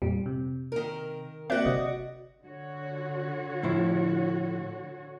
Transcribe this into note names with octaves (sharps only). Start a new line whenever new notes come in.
F2 A#2 G3
C3
D#3 A#4
A#3 C4 F#4 D5 E5 F#6
G1 C3 D#5
D3 F#4 C#5
A2 F3 E4